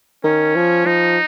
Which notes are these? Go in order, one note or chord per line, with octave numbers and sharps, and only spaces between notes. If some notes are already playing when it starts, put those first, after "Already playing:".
D#3 C#4
F3
F3 D#4